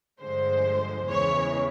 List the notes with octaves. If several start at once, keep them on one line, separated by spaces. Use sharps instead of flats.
G2 D3 F3 G#3 C5
E2 C#3 E3 G#3 C#5